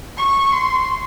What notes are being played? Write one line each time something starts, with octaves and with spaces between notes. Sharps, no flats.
C#6
C6